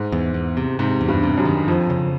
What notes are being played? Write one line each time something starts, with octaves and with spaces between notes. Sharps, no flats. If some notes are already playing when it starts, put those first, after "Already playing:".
Already playing: G#2
E2
E2
C3
G#2 C3
E2
G2
C3
F#2
D#3
F2 F3
C#3